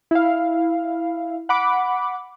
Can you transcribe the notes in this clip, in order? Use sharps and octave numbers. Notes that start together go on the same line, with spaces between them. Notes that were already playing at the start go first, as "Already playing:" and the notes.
E4 F5
F#5 B5 D6